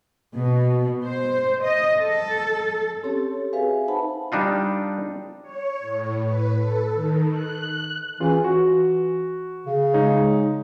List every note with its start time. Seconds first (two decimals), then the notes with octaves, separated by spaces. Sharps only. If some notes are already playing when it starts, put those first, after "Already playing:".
0.36 B2
1.04 C5
1.64 D#5
2.00 A4
3.03 C4 C#4 G4 A4 C#5
3.53 F#4 G#4 B4 E5 F5 G#5
3.87 D#4 B4 C5 F#5 A5 B5
4.32 G3 D4 D#4 F4
5.42 C#5
5.80 A2
6.23 B4
6.56 A4
6.93 D#3
7.32 F#6
8.20 E3 C#4 F4 G#4
8.44 E3 F#4
9.66 C#3
9.94 G#3 D#4 C#5